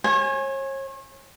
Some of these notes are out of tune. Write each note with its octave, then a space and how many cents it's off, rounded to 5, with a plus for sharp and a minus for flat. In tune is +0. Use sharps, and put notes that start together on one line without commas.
C#5 -40 G#5 +0